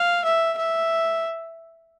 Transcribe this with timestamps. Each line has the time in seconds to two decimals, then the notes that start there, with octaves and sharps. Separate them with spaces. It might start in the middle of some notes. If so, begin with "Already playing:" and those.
Already playing: F5
0.25 E5
0.57 E5